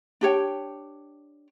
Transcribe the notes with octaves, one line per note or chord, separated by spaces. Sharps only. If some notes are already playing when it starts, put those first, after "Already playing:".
D4 G4 C#5 G5